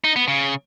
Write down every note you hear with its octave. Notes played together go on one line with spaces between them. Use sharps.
D#4
B3
C#3